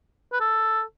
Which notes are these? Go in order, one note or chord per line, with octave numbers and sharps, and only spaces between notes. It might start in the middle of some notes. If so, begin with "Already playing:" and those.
B4
A4